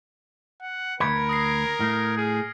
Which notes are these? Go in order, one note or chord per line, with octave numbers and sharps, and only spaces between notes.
F#5
D2 G#2 A#4 B4 G#6 C#7 D7
D#6 A#6 C7
A2 F6 C7
G#4